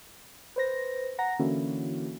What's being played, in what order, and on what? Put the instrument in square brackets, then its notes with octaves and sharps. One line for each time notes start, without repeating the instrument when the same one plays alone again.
[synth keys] B4 C5 A#6
F#5 A#5 A#6
D3 E3 A#3 C#4 E4 F#4